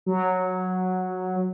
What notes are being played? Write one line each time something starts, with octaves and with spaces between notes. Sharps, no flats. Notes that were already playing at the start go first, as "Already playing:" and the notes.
F#3